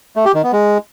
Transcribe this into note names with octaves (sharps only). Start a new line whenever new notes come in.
A3
G4
D#3
B3
G#3